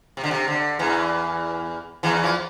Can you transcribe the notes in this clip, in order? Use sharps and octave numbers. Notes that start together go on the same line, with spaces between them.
C3
D3
C3
D3
E2 E3
E2 E3
F3